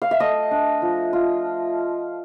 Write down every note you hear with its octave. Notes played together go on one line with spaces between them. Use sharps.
F5
E5
A3 D#5
D4
F3
F4